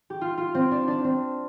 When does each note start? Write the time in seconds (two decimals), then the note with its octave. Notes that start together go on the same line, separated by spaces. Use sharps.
0.10 G4
0.21 F4
0.37 F4
0.54 C4
0.71 D4
0.88 D4
1.04 C4